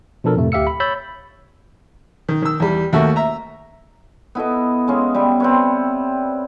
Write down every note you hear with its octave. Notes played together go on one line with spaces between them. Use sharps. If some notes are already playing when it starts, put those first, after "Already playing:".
B2 F3 D4 A4 A#4
F2 A2 C3 A3
D2 G4 E5 F5 E6 C#7
B5
C#5 B5 E6 G6 A6
D#3
D#3 E6
E2 G3
D#2 A3 A#3 F#4 E5
E5 A#5
B3 E4 A4 D#5
G#3 C#4 F5
G3 B3 E5
C4 B4 C#5